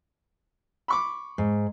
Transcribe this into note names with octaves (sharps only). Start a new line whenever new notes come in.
B5 C#6 D6
G#2